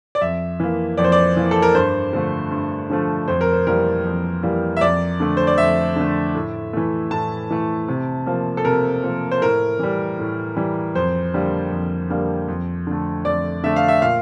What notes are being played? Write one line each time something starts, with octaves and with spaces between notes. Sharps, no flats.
D5
F2 E5
E3 A#3
F2 D5
C5
D5
E3 A#3
A4
A#4
G2 C5
D3 F3 A3
G2
D3 F3 A3
F2 C5
A#4
C5
E3 G3 A#3 A#4
F2
E3 G3 A#3
E5
F2 D5
D3 A3
C5
D5
F2 E5
D3 A3
A2
E3 A3
A2 A5
E3 A3
C3
F3 A#3
A4
C3 A#4
F3 A#3
C5
A2 A#4
E3 G3
A2
E3 G3
F2 C5
D3 G3 A#3
F2
D3 G3 A#3
F2
D3 A3
F2 D5
D3 A3 E5
F5
E5
A#2 F5